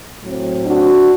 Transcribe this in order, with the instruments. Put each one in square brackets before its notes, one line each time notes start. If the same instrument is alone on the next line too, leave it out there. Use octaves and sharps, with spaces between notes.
[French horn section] A2 F#3 C4
D4 F#4